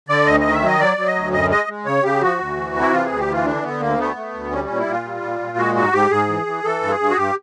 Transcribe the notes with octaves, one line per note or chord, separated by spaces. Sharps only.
D3 D5
D2 D#5
D#3 D#5
E5
F#3 D#5
F#3 D5
F#3
D#5
D2
F#2 D#5
G#3 D#5
G#3
C#3 C#5
C#3 G4
F3 F#4
D2
E3
C3
E4
E3 F4
D2 G#4
G4
E3 F4
D3 D4
D3 B3
D2 A#3
A3 B3
A3
D2
G3 C#4
A#2 C#4
E4
A#2 F4
G3
A#2
A#2
G#3 F#4
G#2 F#4
G#2 G4
G#2 G#4
E3
E3
E3 A4
G2
G#4
G2
F#4
G2 G4